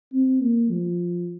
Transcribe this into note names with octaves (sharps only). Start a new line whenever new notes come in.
C4
A#3
F3